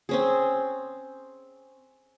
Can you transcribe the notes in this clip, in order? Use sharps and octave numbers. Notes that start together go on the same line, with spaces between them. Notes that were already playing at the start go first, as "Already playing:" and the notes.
C4 C#4 G#4